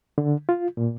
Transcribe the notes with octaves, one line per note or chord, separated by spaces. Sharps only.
D3
F4
A#2